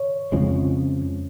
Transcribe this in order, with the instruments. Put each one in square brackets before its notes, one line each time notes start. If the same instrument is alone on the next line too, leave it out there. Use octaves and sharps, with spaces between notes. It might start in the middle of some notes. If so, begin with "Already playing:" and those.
Already playing: [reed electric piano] C#5
[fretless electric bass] F2 C#3 F3 G#3